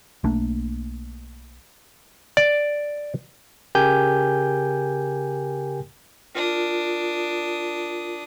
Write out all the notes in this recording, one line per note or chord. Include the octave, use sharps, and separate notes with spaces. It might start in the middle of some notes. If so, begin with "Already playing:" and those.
B1 A3 A#3 D4
D5
C#3 G4 A#4 G5 G#5 G6
D4 F4 A#4 D#6